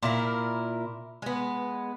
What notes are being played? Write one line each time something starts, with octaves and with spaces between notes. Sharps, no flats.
A#2 E4 A#4
G#3 B3